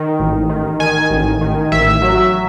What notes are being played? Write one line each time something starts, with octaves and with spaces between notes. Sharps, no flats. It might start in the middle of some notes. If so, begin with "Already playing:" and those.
Already playing: D#3
A1
D#3
D#3 G#5
A1
D#3
A1 E5
F#3